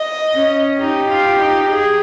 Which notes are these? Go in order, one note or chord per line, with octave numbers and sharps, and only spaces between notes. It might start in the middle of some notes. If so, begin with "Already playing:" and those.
Already playing: D#5
C#4
D#4 G4
F4
D#4
G#4